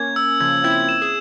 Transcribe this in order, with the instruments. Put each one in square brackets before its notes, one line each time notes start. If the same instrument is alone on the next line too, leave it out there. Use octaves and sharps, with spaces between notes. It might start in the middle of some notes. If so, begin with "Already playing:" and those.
Already playing: [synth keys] A#3 C#4 [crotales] G#6
[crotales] E6
[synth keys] C#3 F3 [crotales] G#6
[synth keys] C4 E4 [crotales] G#6
[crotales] E7
[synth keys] G#4